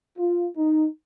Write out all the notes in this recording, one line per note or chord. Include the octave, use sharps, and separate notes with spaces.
F4
D#4